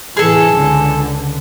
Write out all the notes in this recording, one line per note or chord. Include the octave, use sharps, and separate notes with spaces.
A2 C3 E3 G#4 A4
C#2 D3